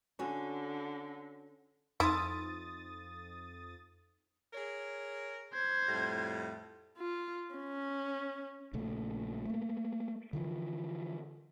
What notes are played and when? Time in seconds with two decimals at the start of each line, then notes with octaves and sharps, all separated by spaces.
0.19 D3 C#4 F#4
2.00 F2 D#4 E4 B4 C6 D#6 A6
4.54 G#4 A#4 C#5
5.53 C5 G#6
5.89 F2 A2 G3
6.97 F4
7.55 C#4
8.73 A#1 A#2 C#3 A3
9.46 A3 A#3
10.33 D3 E3 F3